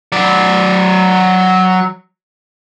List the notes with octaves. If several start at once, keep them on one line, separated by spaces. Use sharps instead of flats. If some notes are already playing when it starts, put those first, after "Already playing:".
F#3 D5